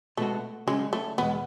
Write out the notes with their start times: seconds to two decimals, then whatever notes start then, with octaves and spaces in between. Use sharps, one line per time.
0.17 B2 G#3 A3 B3 F#4
0.67 C#3 F#3 G#3 C#4
0.93 A3
1.18 E2 B2 G#3 B3